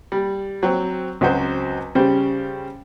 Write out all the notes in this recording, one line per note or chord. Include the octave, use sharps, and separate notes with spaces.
G3
F#3 C4
C#2 F#3 C4 F#4 C5
C#3 G3 G4 C5